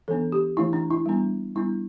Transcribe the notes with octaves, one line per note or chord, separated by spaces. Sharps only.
E3 B3 D4 A4
G4
E3 A3 D4 E4
D4
E4
G3 B3 D4
G3 B3 D4 E4